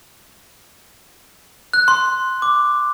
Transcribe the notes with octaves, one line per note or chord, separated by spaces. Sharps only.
F#6
C6
D6